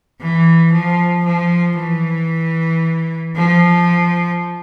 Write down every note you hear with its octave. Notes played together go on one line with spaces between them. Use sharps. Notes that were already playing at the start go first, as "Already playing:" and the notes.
E3
F3
F3
E3
F3